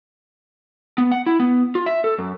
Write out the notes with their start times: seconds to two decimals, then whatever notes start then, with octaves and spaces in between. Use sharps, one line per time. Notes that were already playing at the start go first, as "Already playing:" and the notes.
0.98 B3
1.12 F#5
1.26 E4
1.40 B3
1.75 F4
1.86 E5
2.04 A4
2.18 F#2